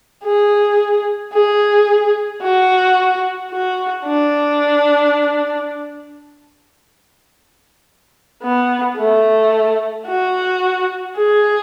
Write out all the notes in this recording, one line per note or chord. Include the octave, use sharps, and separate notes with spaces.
G#4
G#4
F#4
F#4
D4
B3
A3
F#4
G#4